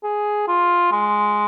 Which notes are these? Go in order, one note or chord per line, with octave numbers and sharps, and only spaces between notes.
G#4
F4
G#3